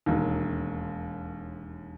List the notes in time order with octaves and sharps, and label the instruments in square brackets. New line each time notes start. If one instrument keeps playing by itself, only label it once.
[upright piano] E1 D#2